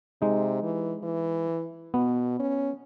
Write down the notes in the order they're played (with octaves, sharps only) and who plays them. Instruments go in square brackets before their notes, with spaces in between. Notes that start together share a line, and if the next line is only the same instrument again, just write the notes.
[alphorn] C3 [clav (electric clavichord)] G#3 D#4
[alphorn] E3
E3
[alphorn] B2 [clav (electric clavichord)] B3
[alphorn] C#4